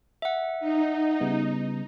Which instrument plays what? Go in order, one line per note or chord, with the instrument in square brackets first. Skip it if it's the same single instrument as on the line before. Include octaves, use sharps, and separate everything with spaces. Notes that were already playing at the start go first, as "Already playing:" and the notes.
[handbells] E5 F#5
[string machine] D#4
[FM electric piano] C#3 G3 B3